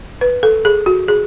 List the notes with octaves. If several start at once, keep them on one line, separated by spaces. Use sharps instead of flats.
B4
A4
G#4
F#4
G#4